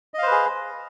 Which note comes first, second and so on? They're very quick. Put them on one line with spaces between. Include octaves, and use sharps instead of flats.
D#5 F5 C5 B4 G#4